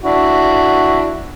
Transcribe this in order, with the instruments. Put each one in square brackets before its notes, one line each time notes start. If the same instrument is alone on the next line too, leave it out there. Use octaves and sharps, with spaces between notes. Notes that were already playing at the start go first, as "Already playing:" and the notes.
[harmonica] D4 E4 F#4